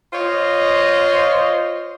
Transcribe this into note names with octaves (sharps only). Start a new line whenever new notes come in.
F4 C5 C#5 D#5